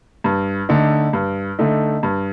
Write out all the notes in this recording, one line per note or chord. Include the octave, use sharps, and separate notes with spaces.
G2
D3 A3 D#4
G2
D3 A3 D#4
G2